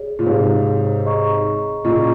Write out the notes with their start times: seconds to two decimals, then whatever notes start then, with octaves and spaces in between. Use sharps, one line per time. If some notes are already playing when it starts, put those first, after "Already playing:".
Already playing: G#4 C#5
0.19 A#2
0.26 G#2 C3 G#4 C#5 F5
1.05 G#4 D#5 A#5 C#6
1.84 A#2 C#3 G#4 D#5 A#5 C#6